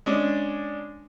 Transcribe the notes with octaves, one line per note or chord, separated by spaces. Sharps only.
G#3 C#4 D4